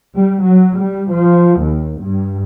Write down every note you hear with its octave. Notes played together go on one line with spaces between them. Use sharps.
G3
F#3
G3
F3
D#2
G2